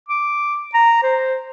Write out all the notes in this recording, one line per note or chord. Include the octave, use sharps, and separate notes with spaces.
D6
A#5
C5